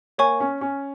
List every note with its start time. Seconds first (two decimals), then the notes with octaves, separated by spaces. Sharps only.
0.18 A#3 C#5 G#5 C#6
0.40 C#4
0.61 C#4